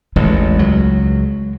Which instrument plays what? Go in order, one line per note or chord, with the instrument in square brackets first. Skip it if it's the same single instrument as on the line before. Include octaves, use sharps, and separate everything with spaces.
[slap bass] A1 E2 [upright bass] G#3
[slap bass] C#2 F#3